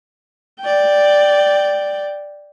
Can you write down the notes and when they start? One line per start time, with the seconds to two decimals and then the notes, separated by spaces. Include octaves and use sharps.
0.61 D5 G5